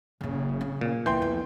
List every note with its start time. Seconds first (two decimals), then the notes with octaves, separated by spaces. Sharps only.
0.21 F#1 A#2 C#3
0.61 C4
0.81 A#2
1.06 C2 E3 A#3 G5 C6 G6
1.22 F2 B3